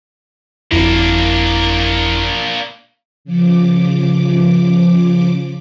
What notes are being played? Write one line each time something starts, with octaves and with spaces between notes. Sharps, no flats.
G1 F2 A#3 D4 E4
C#3 F3 D6